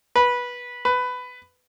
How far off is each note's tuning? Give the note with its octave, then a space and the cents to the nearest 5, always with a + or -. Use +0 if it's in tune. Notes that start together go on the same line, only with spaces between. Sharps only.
B4 -15
B4 +15